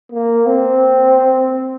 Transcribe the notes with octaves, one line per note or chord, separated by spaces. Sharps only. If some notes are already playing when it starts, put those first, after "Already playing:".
A#3
C4